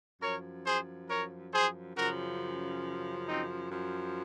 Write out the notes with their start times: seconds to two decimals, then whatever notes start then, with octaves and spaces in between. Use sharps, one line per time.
0.22 F#2 F3 A#4 C#5
0.65 G#4 C5
1.09 A#4 C#5
1.52 G#4 C5
1.96 F#2 C#3 F3 F#4 A#4
3.27 C4 D#4
3.71 F#2 F3